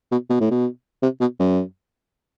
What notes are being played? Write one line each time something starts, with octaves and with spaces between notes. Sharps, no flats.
B2
B2
A2
B2
C3
B2
F#2